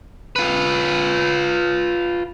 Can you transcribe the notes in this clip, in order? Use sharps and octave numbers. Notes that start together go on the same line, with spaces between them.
F4 B4